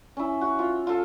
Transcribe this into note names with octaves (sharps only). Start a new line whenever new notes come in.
C#4 E4
F#4
F4
F4 A4